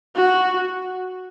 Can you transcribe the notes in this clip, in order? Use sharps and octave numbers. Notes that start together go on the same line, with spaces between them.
F#4